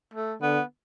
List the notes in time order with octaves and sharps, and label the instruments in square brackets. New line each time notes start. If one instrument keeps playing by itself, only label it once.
[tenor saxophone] A3
[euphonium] D3 [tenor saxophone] B3